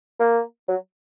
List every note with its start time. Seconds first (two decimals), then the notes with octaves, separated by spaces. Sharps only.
0.19 A#3
0.68 F#3